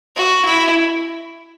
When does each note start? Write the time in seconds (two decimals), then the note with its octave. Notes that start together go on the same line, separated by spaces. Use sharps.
0.16 F#4
0.45 E4